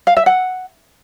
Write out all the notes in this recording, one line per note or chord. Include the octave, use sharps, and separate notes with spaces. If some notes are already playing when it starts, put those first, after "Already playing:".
F5
E5
F#5